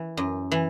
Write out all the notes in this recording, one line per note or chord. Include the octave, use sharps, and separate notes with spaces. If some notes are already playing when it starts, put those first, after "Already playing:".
Already playing: E3
F#2
E3